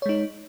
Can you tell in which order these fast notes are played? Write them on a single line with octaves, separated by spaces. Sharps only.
C#5 G#3 D#4